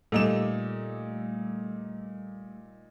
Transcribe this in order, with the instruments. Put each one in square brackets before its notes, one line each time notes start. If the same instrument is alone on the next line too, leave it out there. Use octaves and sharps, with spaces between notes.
[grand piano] A#2 D#4 E7 [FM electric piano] G3 A3